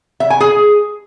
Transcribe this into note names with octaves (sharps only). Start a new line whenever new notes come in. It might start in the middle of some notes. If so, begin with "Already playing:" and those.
E5
G#5
G#4